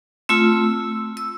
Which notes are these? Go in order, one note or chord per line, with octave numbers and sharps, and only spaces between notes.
A3 C4 F4 E6
E6